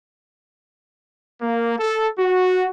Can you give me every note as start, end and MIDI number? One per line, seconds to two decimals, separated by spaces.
1.42 1.75 58
1.79 2.09 69
2.19 2.69 66